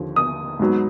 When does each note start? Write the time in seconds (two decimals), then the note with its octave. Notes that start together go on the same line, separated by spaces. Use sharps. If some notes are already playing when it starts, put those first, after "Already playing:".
Already playing: D#2 D3 F3
0.16 D#6
0.59 G#2 F#3 B3